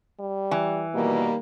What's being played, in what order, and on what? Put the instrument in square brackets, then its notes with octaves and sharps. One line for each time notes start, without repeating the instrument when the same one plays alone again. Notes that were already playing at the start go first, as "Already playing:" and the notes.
[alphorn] G3
[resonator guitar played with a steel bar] E3
[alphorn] B2 [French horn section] D#3 G3 A#3